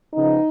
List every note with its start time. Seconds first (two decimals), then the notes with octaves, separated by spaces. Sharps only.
0.14 C#3 F3 B3 D#4